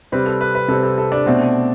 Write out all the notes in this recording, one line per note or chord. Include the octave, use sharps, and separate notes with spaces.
C3 G3 C4 B4
A4
B4
B4
C3 G3 C4 A4
A4
A4
D4 D5
B2 A3 C4